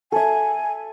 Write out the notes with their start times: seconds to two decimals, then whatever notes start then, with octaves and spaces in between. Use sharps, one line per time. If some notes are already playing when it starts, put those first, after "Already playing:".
0.12 A4 E5 G#5